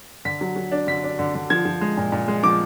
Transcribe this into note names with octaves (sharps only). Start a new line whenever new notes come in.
D3 B6
F#3
F#3
D4
D3 B6
D4
D3
D3
F3 G#6
F3
G#3
A#2
A#2
G#3
F3 D6